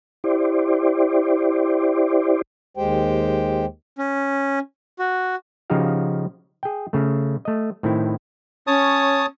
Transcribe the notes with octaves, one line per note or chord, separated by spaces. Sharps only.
E4 G4 C5 D5
D#2 G#3 G4 C5 G5
C#4
F#4
C#3 F3 D#4 F#4 G4 F5
G#4 G5
C#3 A3
A3 D#5
A2 D#3 C4 E4
C#4 C#5 A5 D#6